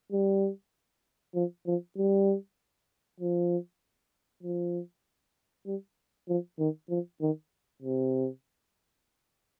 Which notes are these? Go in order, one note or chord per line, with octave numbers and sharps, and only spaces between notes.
G3
F3
F3
G3
F3
F3
G3
F3
D#3
F3
D#3
C3